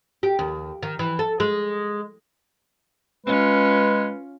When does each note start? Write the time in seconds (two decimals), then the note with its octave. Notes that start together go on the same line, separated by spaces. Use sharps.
0.23 G4
0.39 D#2
0.83 D#3
0.99 E3
1.19 A4
1.40 G#3
3.26 G#3 C#4 F4 B4